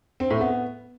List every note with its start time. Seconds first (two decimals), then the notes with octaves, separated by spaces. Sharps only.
0.20 C4
0.30 A2
0.41 B3